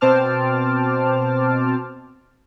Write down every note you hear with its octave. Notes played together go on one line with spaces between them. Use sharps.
B2 C4 C5 A5 D6 F6